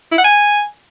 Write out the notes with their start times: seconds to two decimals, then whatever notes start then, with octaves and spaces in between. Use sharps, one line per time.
0.12 E4
0.18 F#5
0.24 G#5